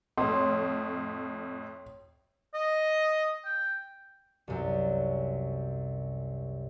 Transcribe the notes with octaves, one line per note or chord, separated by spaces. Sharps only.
F2 A2 C#5 C6
D#5
G5
C2 F#2